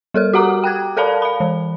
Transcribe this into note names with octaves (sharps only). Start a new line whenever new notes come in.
G3 A4 A#4 F6
F#4 G4 F#5 A#5 D6 D#6
G5 F#6 G#6
A4 A#4 D5 F5 A5 B5
F5 B5
E3